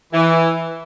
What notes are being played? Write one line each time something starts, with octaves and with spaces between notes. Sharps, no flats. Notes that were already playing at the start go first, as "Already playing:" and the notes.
E3